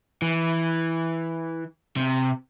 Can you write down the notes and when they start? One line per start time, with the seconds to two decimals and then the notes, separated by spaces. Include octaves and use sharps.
0.22 E3
1.96 C3